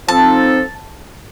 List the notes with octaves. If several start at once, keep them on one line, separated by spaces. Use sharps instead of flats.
F3 C4 D#4 A4 A5